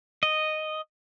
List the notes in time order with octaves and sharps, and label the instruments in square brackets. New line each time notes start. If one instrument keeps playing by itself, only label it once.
[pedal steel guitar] D#5